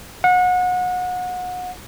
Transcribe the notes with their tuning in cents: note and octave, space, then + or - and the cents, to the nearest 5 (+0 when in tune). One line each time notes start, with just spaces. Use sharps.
F#5 -30